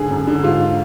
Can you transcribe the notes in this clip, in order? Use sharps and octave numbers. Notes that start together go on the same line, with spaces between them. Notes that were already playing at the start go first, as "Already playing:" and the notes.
Already playing: G#2 D3 G#4
F#2
D3
G#2 F4